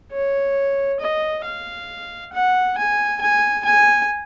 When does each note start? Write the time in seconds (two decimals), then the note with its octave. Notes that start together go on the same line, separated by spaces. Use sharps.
0.12 C#5
1.00 D#5
1.44 F5
2.33 F#5
2.77 G#5
3.21 G#5
3.65 G#5